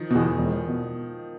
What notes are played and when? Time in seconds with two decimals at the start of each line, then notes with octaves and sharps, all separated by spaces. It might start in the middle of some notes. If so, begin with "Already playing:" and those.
Already playing: D#3 F3
0.10 E2 B2
0.38 E1
0.68 B2